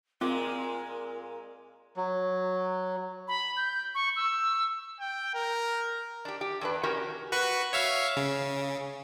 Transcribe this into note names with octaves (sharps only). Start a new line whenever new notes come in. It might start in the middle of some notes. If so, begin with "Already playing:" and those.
A#2 G#3 C4 F4 A#4 D6
F#3
B5
G6
C#6
E6
G5
A#4
D4 G4
G4
E2 D4 B4
C#4 F#4 G4 A#4
F#4 B4 C#6
C#5 E5 F5
C#3